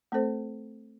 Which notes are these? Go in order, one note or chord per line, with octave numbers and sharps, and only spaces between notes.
A3 C4 A4 C5